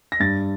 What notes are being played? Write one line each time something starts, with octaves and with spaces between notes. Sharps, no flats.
A#6
G2 A6